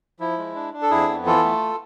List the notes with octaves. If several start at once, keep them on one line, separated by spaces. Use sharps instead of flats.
F3 E4
G#3
D4
D4
A4
F2 E4 G#4
B3
E3 F4 A4
A3